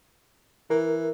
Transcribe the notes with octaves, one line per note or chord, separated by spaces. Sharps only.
E3 A#4